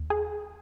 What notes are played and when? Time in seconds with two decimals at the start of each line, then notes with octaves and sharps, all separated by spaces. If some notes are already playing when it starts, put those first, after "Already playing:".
Already playing: D#2
0.10 G#4